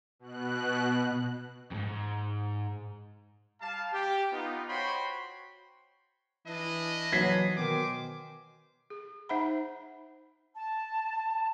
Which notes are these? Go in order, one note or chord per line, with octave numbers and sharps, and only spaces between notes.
B2 F#6
F2 G#2
G3 F5 A5
G4
B3 D#4 F4
F#4 C5 C#5 G5 B5 C6
E3 D4 E4 D#5
E3 F#3 G#6 B6 C7
B2 D#3 C5 G#5 D6
G#4
D#4 C5 E5 F#5 B5
A5